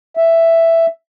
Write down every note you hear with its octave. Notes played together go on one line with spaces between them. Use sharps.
E5